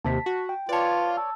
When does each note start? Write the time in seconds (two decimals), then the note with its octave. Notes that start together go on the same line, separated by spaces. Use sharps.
0.05 D#2 C3 A5 B6
0.26 F#4
0.49 G5
0.69 F4 B4 C#5 D5 A5
1.17 A5 E6